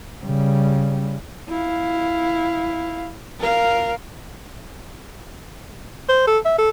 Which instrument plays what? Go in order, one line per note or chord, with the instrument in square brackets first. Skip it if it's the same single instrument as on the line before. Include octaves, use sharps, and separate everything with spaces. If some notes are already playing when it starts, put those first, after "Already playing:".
[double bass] C#3 G3
[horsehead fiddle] E4 F5
A#4 F5
[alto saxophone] C5
A4
E5
A4